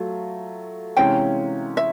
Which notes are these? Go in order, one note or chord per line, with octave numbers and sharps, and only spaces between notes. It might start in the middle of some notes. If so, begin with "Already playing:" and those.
Already playing: F#3 A3 F4
C3 E3 G#3 C#4 F5 G5
E5